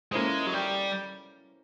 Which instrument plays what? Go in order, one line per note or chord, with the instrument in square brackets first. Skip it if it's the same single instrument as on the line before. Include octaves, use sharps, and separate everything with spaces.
[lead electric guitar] G#3 [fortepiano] A#3 C#4 E4 A4 C5
[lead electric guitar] F#3
G3